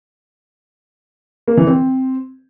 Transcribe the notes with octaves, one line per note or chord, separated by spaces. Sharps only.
A#3
E3
C4